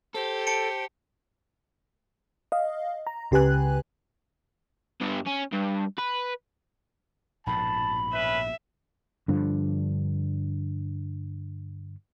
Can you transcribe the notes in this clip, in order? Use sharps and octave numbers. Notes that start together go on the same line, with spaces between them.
G4 A4 C5
A5 C#7 D7
D#5 F5
A#5
C#2 C#3 G4 B4 G#5 F#6
G2 B3
C#4
G2
B4
A#1 G#2 B2 A5 B5
C#4 B4 E5
G2 D3 F3